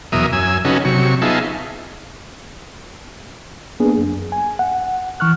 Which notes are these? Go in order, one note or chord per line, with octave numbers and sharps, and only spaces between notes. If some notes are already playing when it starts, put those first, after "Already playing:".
E2 B2 F#3 A#4 E5 D#6
F#2 G#5 E6
C#3 C#4 D#4 F#4 A4 B4
C3 F#3 C#6
B3 D#4 F4 G#4 E5 A5
A#3 B3 D4 G#4
F#2
G#5
F#5
E3 C#6 F6 F#6